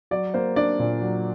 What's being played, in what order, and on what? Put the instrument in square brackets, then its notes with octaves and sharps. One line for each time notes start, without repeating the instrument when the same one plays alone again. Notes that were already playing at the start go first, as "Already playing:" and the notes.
[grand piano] F#3 [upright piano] D5
[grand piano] A#3 [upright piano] C5
[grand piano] D4 [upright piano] D5
[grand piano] A#2
F#3